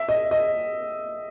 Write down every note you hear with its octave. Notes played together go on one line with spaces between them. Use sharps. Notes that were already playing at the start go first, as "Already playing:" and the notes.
Already playing: E5
D#5
D#5